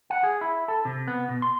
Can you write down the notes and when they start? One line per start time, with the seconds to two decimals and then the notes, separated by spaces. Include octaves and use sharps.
0.10 F#5
0.23 G#4
0.41 E4
0.68 A4
0.85 C3
1.07 B3
1.29 B2
1.42 C6